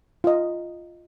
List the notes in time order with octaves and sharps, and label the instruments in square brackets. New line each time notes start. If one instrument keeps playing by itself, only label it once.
[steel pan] F4 D#5